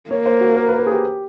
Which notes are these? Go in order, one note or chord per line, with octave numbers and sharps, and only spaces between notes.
A#3 C#5
C5
F#4
A#4
B4
A#4
G#4
G4